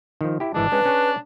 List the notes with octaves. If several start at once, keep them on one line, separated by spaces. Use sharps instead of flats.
D#3 F3
E4 G4
G#1 E3 G#3 D4
G#3 C#4 B4
C#4 G#4 C#5